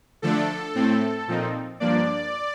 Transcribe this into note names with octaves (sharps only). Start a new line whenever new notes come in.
D3 F3 A3 D4 A4
A2 A3 C4
A#2 F3 C4 D#4
G2 F3 A#3 D4 D5